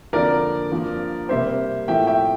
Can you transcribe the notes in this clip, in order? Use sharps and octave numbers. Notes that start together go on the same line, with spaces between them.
F2 D3 F3 A#3 A#4 D5
G2 F3 A#3
C3 G3 A#3 C5 E5
A2 F3 A3 E5 G5
E5 G5